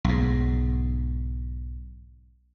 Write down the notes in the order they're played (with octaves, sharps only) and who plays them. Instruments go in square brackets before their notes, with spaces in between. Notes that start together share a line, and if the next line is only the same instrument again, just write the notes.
[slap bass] B1 G#2